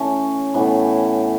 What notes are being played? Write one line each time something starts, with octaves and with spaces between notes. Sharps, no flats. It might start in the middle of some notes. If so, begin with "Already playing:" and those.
Already playing: E3 A3 C#4
A2 E3 B3